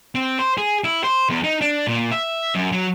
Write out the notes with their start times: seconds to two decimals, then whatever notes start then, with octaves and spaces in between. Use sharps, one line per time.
0.15 C4
0.39 C5
0.58 G#4
0.84 E4
1.04 C5
1.29 E2
1.44 D#4
1.61 D4
1.87 A#2
2.11 E5
2.55 F#2
2.72 F#3